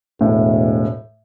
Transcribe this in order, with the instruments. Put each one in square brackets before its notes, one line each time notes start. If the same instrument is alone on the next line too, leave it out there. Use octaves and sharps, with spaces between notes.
[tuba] E1 [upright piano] A2